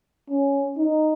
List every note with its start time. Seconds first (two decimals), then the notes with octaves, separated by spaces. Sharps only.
0.30 C#4
0.78 D#4